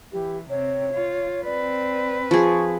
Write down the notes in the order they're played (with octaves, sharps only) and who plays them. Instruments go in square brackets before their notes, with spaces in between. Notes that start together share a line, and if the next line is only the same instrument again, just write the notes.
[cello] E3 [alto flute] G4
[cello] C3 C4 [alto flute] C#5
[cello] F4
[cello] C4 B4 [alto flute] D5
[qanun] F3 G#4 [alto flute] C#6